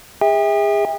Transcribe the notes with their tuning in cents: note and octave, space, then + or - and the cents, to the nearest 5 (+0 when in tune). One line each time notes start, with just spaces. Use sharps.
G#4 -30 E5 -25 G5 +40